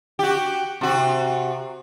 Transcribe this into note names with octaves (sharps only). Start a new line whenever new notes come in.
F#4 G4
C3 F#4